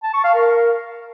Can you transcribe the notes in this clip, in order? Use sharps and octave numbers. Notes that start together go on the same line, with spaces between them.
A5
C#6
F5
A#4